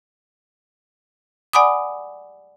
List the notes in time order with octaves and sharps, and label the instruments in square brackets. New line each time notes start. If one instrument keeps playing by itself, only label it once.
[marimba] D5 F#5 G#5 B5 D6 D#6